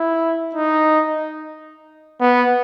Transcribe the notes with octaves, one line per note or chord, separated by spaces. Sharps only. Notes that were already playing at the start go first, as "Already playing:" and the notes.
Already playing: E4
D#4
B3